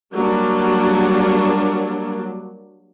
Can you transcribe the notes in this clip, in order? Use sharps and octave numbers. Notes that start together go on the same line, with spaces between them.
F#3 G3 A#3 D4